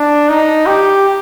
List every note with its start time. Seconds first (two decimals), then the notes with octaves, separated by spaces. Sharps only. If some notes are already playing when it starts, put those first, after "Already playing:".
Already playing: D4
0.29 D#4
0.66 G4